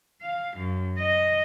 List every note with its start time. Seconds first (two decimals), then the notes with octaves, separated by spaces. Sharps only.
0.22 F5
0.56 F#2
0.98 D#5